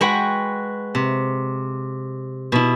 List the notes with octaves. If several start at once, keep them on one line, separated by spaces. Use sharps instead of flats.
G#3 F#4 B4 F#5 G5
C3
B2 E4